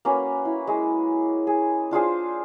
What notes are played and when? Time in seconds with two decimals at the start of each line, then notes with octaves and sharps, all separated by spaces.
0.05 A#3 C#4 F#4 B4
0.45 E4
0.67 G#3
1.47 G#4
1.91 D4 F4 G#4 C5